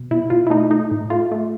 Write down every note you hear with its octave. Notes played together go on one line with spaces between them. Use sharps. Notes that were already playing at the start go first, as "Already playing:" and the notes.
Already playing: B2
B2 E4
B2 F4
E4
A3 D#4
A3 D#4
A2
A3 F4
A3